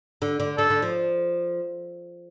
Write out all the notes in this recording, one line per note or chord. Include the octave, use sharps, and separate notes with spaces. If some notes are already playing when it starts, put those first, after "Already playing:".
D3
D3
D3 A4
D3
F3